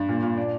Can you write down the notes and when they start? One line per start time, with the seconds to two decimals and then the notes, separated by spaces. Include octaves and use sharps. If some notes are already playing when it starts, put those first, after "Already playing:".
Already playing: G2
0.09 A#2
0.23 A#2
0.37 D4